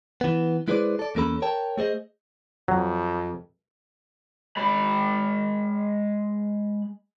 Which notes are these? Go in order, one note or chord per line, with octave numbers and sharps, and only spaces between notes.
E3 B3
G#3 E4 G#4 B4 C5 D5
A4 D5
E2 A#3 C#4 A4 B5
A#4 C#5 G5 A5
A3 G#4 C5 D#5
F2 F#3
G#3 B5